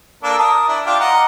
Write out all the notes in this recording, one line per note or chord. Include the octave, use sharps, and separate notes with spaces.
A#3 D4 A4
A#4 A5 D#6
D4 E4
D4 F4 G4
D#5 F#5 A#5